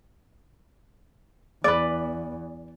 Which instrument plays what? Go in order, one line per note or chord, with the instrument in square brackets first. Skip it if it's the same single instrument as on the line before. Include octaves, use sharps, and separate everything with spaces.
[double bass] E2 [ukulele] B4 D5